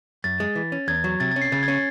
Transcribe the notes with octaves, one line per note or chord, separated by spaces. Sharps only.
F#2 A6
G#3
E3
C#4
E2 G#6
F#3
C3 A6
A6
C#4
C7
C#3 A6
G#6
C#4
A6